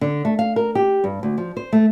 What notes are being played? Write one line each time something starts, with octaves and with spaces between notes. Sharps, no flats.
D3
A3
F5
A#4
G4
G2
D2
F3
C5
A3